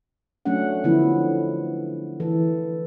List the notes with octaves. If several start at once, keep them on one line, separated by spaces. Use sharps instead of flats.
F#3 A3 C#4 D4 F#5
D3 F3 F#3 B3 E4
E3 A4